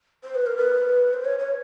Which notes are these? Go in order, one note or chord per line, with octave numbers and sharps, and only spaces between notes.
C5
B4
A#4
B4
C5
C#5
C#5